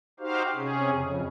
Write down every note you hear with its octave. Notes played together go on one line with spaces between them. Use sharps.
D#4 F#4 G4 C5 F5
C3 C#4 G#4
F2 C#3